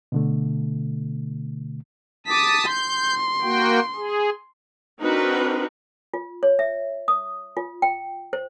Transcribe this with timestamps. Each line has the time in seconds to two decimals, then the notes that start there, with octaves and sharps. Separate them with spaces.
0.12 B2 D3 A3
2.26 A5 D6 D#6 B6
2.67 C6 G6
3.42 A#3 F#4 G5
3.95 G#4
5.01 C4 D4 D#4 F#4 A#4 B4
6.14 F4
6.43 C#5
6.59 E5
7.08 D#6
7.57 F4
7.82 G5
8.33 C5